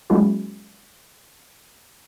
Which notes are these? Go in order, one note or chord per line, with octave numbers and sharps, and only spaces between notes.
F#3 G#3 A#3 C#4 E4 F#4